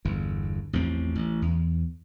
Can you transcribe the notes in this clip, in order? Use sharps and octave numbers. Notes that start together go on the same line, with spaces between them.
G1 E2
A1 E2 F3 C4
A1
E2